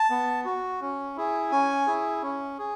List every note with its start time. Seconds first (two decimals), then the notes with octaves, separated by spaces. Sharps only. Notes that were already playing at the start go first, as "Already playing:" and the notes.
Already playing: A5
0.10 B3
0.45 F#4
0.82 C#4
1.17 E4 G#4
1.51 C#4 G#5
1.87 E4 G#4
2.22 C#4
2.59 G#4